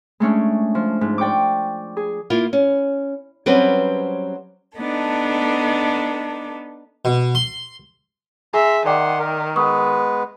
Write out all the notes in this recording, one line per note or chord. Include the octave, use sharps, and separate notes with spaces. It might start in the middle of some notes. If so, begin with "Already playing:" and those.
G#3 A3 C#4 D4
F3
G#2
D5 G5 C#6 D6
G#4
A#3 E4 F4
C#4
F#3 G3 C4 C#4 B4 C5
B3 D4 D#4 A4
B2
C6
G#4 E5 G#5 A#5 C6
D#3 D5 F#5 G5 C6 D6
A#4
G#3 B3 B4 C#6 D#6 E6